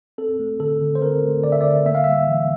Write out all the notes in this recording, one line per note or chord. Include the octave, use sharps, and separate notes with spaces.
C4 A4
A3
D3 A4
D3
C5
C4 A#4
A3
D3 D5
E5
D3 D5
A#3 E5
F5
G3 E5
E3